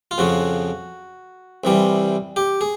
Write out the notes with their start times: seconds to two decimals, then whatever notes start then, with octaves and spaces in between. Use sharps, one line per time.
0.11 F4
0.18 F2 C#3 F3 F#4
1.64 C2 C3 E3 G3
2.36 G4
2.61 G#4